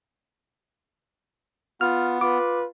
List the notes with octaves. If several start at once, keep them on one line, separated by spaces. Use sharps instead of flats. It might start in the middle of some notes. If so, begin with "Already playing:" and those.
B3 F4 F6
F4 B4 D6